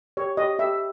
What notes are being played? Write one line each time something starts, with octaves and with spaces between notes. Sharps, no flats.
G4 C#5
G4 D#5
G4 E5